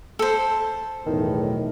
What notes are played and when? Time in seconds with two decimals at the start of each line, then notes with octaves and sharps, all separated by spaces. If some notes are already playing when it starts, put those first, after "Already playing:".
0.19 A4 C5
1.06 B1 E2 A2 D#3